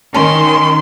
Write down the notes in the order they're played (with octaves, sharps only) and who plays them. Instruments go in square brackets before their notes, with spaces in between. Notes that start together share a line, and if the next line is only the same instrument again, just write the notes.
[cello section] D#3 [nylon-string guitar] C#4 [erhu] C6